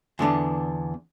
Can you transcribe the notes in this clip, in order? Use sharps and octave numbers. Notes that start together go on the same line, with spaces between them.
E2 D3 B3 D4